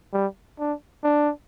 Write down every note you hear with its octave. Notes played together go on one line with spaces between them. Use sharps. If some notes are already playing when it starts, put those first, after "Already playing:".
G3
D4
D4